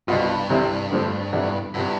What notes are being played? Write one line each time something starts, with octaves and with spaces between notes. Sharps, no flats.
C2 G2 B2 B3 F4
C2 C3 E3 G3 C4
F2 D3 F3 A3 C4
F2 C3 E3 B3 D4
G2 C3 F3 B3 E4